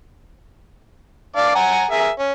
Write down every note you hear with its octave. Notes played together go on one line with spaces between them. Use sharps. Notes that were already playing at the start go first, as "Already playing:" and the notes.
D4 D5 F5
F#5 G#5 A#5
G#4 A#4 E5
C#4